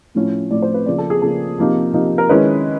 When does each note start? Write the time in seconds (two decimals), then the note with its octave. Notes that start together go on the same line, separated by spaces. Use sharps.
0.15 A2 F3 A3 C#4 E4
0.51 A2 F3 A3 C#4 E4 D5
0.62 C5
0.74 B4
0.86 C#3 F3 A#3 D5
0.98 A4
1.10 G#4
1.22 C#3 F3 A#3 A4
1.58 C3 F3 A#3 D#4
1.94 C3 F3 A#3 D#4
2.18 A#4
2.29 D#3 G#3 C#4 E4 B4